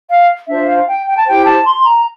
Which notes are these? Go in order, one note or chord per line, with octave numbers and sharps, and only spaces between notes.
F5
D4 F4 C5 E5
F5
G5
G5
A5
E4 G4 C5 G5
A5
C6
A#5